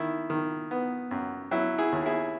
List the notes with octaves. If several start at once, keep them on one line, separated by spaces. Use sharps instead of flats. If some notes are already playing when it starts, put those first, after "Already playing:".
Already playing: D#3 E4
D#3
B3
F#2
F#3 E4
E4 G#4
D#2
E4 G#4